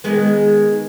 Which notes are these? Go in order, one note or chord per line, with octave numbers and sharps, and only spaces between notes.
D#3 G#3 B3